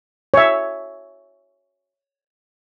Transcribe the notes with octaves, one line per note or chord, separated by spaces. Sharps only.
C#5 E5